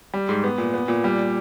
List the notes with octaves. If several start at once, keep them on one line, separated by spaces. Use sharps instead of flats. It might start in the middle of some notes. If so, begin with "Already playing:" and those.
G3
G#2
B3
A#2
B3
A#2
G3